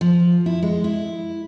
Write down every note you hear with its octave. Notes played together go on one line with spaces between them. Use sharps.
F3
E4
G#3
E4